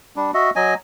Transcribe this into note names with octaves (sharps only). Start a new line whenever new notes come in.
G3 D4
F#4 D#5 E5
F#3 D#5 G#5